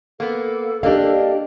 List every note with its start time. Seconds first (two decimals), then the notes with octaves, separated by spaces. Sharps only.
0.20 A#3 B3 A4
0.83 A#3 D4 G4 D#5 F5